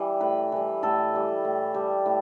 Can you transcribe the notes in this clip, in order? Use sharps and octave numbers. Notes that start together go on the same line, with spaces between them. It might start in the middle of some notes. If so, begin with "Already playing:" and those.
Already playing: E3 G3
A2 B4
E3 G3
A2 A4
E3 G3
A2
G3
A2